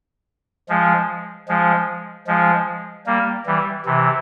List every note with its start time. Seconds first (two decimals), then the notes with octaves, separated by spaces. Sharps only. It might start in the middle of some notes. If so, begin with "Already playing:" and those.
0.69 F3 G#3
1.48 F3 G#3
2.28 F3 G#3
3.07 G3 A#3
3.46 E3 G3
3.86 C3 E3